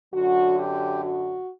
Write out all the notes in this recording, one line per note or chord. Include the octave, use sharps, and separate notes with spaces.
F#2 D3 F#3 F#4
G4
F#4